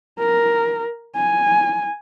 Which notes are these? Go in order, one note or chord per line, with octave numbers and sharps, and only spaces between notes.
A#4
G#5